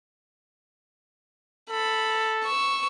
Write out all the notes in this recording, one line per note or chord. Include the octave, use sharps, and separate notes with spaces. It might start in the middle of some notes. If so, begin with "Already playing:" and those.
A4 B5
C#6 E6